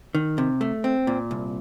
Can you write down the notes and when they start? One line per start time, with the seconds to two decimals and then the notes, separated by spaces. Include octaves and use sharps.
0.15 D#3
0.38 C3
0.61 A3
0.84 C4
1.07 A#2
1.31 C2